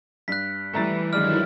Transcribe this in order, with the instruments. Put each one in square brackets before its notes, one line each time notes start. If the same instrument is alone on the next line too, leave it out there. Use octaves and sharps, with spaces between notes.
[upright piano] G2 [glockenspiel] F#6 B6
[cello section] E3 G3 [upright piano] A3 A#5 A6
[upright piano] G2 G#3 D5 [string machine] D#3 F#3 E4 [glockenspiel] F6